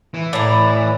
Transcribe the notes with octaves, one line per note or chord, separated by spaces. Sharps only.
E3
A2 D5 A#5